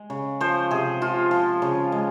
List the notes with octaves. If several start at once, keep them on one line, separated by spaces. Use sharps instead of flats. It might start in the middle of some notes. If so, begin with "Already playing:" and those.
Already playing: G#3
C#3
F3 C5
C3 G#4
F3 F4
F3
C#3
G#3